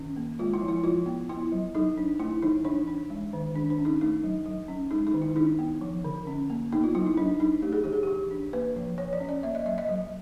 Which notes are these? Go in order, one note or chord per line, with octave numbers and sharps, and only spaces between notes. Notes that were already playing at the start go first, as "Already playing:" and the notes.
Already playing: D#3 C#4
A#3
G#3 F4
E4
F3
E4
F3 F4
B3
B3 E4
F#3
F#3 D#4
D4
A3 E4
E3 D#4
E3 D4
D4
G#3
D#3
D#3 D4
D4
C#4
D#4
A3 D#4
F#3
F#3
C#4
G#3 D#4
D#4
D#3
E4
D4 D#4
B3
F3
D3
C#4
A#3
B3 D#4
F4
F#3 E4
D#4
F#3 D4
D4 D#4
A3 G4
G#4
E3 G4
G#4
E3 G4
D4
A#3 B4
F3
F3 C#5
D5
C#4
D5
A#3 E5
D#5
F#3 E5
D#5
F#3